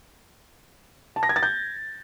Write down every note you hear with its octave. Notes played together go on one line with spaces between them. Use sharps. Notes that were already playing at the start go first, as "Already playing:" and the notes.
A5
A#6
G#6
A6
G6